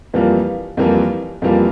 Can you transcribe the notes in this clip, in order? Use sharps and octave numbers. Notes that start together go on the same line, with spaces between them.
F2 E3 G3 A#3 F4
F2 E3 G3 A#3 F4
F2 E3 G3 A#3 F4